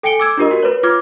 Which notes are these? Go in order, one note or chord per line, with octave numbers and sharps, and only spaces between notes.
A4 G5 G#5 C#7 D7 G7
D6 E6 G#6
D4 F4 G4 A#4 D#5
F#4 A#4
B4 C#5
F4 D6 F6 G#6